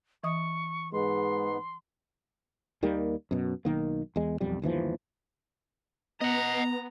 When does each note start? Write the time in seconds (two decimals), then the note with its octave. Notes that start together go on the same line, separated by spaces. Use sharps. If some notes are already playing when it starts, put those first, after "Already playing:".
0.23 E3 D#5 C#6 D#6
0.93 G#2 G#3 B3 C6
2.83 D#2 D#3 G3 A#3
3.31 F#2 B2
3.65 B1 D#3 A#3
4.16 E2 G#3
4.41 E1 B1 F2 G3
4.62 G1 D#2 E3 F3
6.21 B3 D#5 F#5 A#5